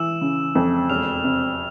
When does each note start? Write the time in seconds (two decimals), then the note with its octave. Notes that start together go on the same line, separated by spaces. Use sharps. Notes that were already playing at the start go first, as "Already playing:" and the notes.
Already playing: E3 E6 E7
0.21 C#3
0.55 F2
0.89 E1 F6 F7
1.24 C3